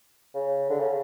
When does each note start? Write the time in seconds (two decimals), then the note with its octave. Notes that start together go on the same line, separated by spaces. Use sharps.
0.34 C#3
0.70 D3
0.80 C#3